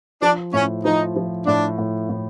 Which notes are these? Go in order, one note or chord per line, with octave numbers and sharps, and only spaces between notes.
F3 D4
A2 C#4
F3 D#4
F3
A2 D4
A2
A2